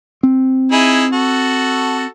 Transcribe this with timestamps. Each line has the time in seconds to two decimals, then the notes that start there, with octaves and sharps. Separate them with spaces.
0.23 C4
0.72 D#4 E4 G#4
1.13 F#4 A4